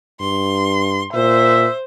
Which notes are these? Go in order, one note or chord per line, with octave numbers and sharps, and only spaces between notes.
G2 C6
A#2 C5 E5